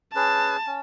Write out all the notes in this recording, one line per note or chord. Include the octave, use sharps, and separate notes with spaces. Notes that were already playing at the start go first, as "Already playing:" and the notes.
C#4 G#4 B4 A5
C#4